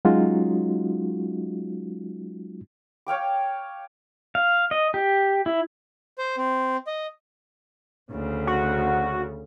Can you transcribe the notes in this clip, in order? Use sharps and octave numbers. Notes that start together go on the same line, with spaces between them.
F#3 G#3 C#4 D#4 F4 F#4
C#5 F5 G5 D6
F5
D#5
G4
E4
C5
C4
D#5
D2 C#3
F#4